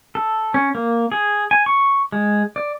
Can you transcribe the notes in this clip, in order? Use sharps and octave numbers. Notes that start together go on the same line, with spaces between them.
A4
C#4
A#3
G#4
G#5
C#6
G#3
D5